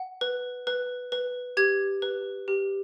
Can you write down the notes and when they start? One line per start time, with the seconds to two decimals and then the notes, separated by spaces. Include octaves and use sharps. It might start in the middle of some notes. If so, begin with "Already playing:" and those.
Already playing: F#5
0.21 B4
0.67 B4
1.12 B4
1.57 G4 G#6
2.02 B4
2.48 G4